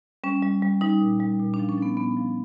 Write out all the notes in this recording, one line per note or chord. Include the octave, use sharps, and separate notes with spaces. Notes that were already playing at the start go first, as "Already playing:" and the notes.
G3 C#4
G3
G3
G3 D#4
A#2
G3
A#2
D4
F3
C#4
F3 B3
A#2 B3
F3